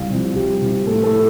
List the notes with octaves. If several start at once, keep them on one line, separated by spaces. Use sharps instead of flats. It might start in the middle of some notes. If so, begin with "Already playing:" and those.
Already playing: C2 F5
C3 F3
C2 G4
C3 F3
A2 A4
A4
E4